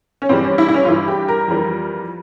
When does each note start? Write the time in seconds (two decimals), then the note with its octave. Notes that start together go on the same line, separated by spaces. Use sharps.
0.22 C#4
0.29 G2 E3 G3 C4
0.44 C#4
0.58 E4
0.69 E4
0.74 C#4
0.85 F4
0.88 G2 E3 G3 E4
1.08 G4
1.28 A#4
1.48 F2 E3 G3